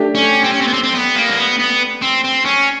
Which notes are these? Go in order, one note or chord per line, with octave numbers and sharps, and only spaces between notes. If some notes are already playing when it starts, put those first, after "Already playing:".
Already playing: A3 D4 G4
C#4
C4
C#4
C4
B3
C4
C4
B3
A#3
C4
B3
B3
C4
C4
C#4